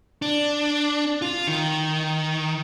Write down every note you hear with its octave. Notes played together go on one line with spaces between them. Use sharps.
D4
F4
D#3